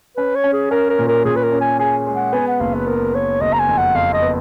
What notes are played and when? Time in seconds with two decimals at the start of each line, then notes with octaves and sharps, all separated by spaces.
0.17 C#4 B4
0.35 C#5
0.44 C#4
0.53 G#4
0.71 C#4 A#4
0.90 A#4
0.99 A#2
1.08 A#4
1.25 A#2 G#4
1.36 B4
1.43 A#4
1.52 C#4
1.61 G#5
1.79 G#4 G#5
2.07 G#3
2.15 F#5
2.33 B3 G#5
2.47 F#5
2.60 F#1 F5
2.74 B4
2.87 B3 A#4
3.14 B3 C#5
3.41 F#1 D#5
3.53 A#5
3.59 G#5
3.69 F2
3.78 F#5
3.95 F2 F5
4.14 D#5
4.22 B3